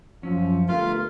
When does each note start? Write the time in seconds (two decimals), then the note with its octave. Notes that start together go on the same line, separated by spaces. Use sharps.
0.23 F#2 F3 C#4
0.69 G1 A3 F4 A#4